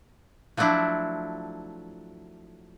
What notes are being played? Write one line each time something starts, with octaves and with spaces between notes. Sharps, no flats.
F3 F#3 A3 D4 E4